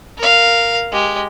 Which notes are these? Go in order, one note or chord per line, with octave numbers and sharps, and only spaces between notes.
A#4 F5
G#3 G4